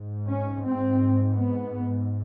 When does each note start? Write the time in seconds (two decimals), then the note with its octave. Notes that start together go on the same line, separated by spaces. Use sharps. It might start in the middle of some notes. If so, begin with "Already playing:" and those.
Already playing: G#2
0.28 C#4
0.64 C4
1.34 B3